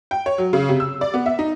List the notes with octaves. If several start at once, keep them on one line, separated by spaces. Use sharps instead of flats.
G5
C#5
F#3
C#3
C3
E6
D5
B3
E5
D#4